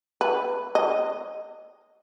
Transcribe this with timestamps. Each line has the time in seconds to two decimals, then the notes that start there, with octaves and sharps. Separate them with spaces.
0.21 B4
0.75 D#5